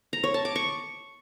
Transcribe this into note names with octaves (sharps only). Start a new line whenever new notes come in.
A#5
C#5
A5
D6
C#6